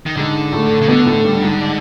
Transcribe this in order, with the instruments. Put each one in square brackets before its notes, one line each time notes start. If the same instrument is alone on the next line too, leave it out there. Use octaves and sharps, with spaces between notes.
[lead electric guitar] D#3
[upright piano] G#2 G#3 [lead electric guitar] D3
[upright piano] A2 A3
[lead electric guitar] C#3
[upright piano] B2 B3 [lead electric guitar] D3
[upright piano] A2 A3
G2 G3
G#2 G#3